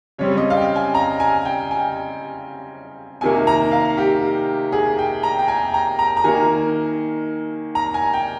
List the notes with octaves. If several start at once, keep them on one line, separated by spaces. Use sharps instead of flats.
C#3 G3 C4 C#5
D#5
F5
G5
G#5
A#5
G#5
G5
G#5
C3 D#3 A#3 G#5
A#5
F5
G4
G#4
G5
A#5
G5
G#5
A#5
A#5
A#5
D#3 A#3 G#5
A#5
G#5
G5